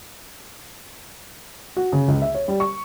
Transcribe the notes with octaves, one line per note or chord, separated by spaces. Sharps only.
F#4
C#3
C#2
E5
C#5
G3
C#6